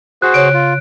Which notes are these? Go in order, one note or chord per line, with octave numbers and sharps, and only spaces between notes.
F#4 G#4 C5 F#6
C#3 C#5 D7
F4